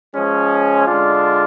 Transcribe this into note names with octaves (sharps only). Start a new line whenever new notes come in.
F3 G#3 C#4
D3 G#3 D4 F4